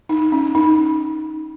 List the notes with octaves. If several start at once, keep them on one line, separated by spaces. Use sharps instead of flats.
D#4
C#4
D#4